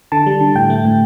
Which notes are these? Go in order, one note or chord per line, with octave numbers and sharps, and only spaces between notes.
D3 A5
G3
D3
A2 G5
A3
A2